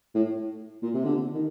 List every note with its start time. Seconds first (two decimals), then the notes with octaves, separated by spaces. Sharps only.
0.15 A2
0.82 A#2
0.94 C3
1.04 D3
1.34 D#3